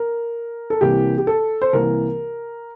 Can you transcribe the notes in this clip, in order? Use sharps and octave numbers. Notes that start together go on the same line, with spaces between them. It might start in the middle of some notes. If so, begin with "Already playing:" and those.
Already playing: A#4
A4
C2 C3 E3 A#3 G4
G4
A4
C5
C2 C3 E3 A#3 A#4